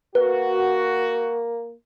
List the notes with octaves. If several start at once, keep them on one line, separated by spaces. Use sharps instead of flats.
A#3 F#4 B4